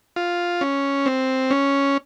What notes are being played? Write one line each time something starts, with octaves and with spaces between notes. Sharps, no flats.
F4
C#4
C4
C#4